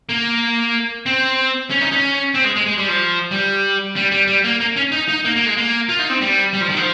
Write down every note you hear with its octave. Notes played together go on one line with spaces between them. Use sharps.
A#3
C4
C#4
D#4
C#4
C4
G#3
G#3
G#3
G3
F3
G3
G3
G3
G3
A#3
A#3
C#4
D#4
D#4
A#3
A#3
G#3
A#3
F4
D#4
C4
G3
G3
F3
D#3
F3